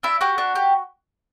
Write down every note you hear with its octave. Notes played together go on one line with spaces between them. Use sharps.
D4 E4 E5
F#4 G4 F#5
D4
G4